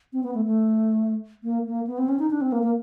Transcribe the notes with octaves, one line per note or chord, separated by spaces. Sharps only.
C4
B3
A3
A3
A#3
A#3
B3
C4
C#4
D#4
D4
C4
A#3
A#3